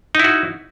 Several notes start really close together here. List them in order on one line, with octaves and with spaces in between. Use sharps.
D#4 E4 F#4